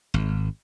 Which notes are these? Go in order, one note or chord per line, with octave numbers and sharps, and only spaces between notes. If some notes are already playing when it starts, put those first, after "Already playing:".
G#1